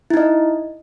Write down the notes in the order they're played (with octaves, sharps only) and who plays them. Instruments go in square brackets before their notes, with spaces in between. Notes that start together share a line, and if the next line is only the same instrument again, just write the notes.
[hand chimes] E4
D#4
D#5